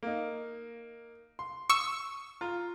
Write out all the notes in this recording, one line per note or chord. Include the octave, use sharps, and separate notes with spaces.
A#3 D#4
C6
C#6 D#6 E6
F4 A#5